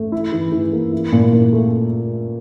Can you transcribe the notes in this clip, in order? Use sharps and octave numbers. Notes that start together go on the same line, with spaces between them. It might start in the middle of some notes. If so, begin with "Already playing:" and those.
Already playing: A3
E4
E3
E3
A#3
E4
A#2
A#2
A3